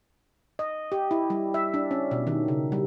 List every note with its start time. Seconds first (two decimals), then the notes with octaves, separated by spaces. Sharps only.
0.59 D#5
0.92 G4
1.11 E4
1.30 G3
1.54 E5
1.74 D4
1.91 C#4
2.11 B2
2.27 D#3
2.48 C#3
2.72 G3